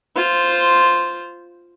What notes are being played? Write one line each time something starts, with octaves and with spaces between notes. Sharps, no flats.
F4 C5